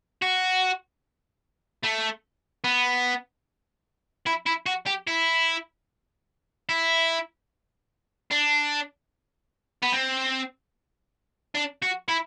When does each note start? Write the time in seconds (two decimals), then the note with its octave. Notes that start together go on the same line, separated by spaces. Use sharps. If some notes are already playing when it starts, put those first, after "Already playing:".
0.22 F#4
1.83 A3
2.64 B3
4.27 E4
4.46 E4
4.66 F#4
4.86 G4
5.07 E4
6.69 E4
8.31 D4
9.83 B3
9.93 C4
11.55 D4
11.82 F#4
12.08 E4